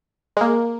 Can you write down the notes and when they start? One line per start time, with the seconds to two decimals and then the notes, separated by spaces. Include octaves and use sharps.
0.37 G#3
0.41 A#3